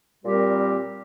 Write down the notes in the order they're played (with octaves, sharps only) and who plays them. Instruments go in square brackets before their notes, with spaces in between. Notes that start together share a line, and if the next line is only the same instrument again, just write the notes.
[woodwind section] A#2 G3 C4 G4 A#4